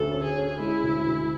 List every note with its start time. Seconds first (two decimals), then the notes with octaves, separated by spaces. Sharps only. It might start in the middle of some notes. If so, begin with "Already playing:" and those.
Already playing: D2 D3 C#4 A4
0.11 C#4
0.23 G#4
0.36 C#4
0.59 G#3 E4
0.83 D2
1.07 D2